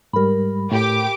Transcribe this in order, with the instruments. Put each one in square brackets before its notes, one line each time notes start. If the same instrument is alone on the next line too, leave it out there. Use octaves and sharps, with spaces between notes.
[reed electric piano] G#2 G3 [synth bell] A#4 B5
[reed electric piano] A2 [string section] G4 D6